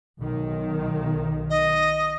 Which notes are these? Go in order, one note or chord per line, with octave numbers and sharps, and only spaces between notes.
B1 D#3
D#5